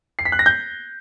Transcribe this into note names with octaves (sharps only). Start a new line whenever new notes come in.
C7
B6
F#6
A#6
G6